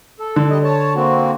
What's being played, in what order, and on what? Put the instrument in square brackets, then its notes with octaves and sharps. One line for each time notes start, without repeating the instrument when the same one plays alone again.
[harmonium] A4
[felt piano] D3
[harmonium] G3 D#5
C#5 A5
A#3 C4 F#4